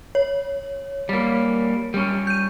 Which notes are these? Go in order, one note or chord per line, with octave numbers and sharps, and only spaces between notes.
C#5
G3 A#3
G3 C#4
G6 D#7